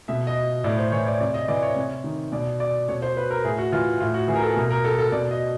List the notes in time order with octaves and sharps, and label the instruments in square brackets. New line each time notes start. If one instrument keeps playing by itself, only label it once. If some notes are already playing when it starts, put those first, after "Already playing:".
[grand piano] B2 E5
D#5
A2 D5
C5
E3 C#5
D5
C3 D5
D#5
E3 D5
C#5
C3
D#3
B2 D5
D5
B2 C#5
C5
B4
A#4
A2 G#4
F#4
E3 F4
A2 F4
F#4
E3 G#4
A#4
A4
B2 A#4
A#4
A4
A4
B2 D5
D#5